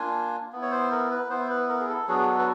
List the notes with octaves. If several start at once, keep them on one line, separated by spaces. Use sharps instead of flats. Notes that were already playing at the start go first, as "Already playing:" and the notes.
Already playing: A#3 D4 F4 G#5
B3 E4
C#5
C5
A#4
B4
B3 E4 C5
B4
A#4
G#4
A4
F#3 B3 D4 F#4 G#4
A4
B4